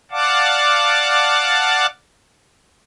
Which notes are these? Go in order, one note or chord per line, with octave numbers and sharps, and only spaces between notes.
D5 F5 F#5 A5 D6